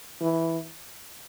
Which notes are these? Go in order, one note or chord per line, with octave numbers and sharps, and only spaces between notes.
E3